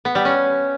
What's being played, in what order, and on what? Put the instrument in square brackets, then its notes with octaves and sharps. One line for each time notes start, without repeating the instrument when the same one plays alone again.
[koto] B3
G3
C#4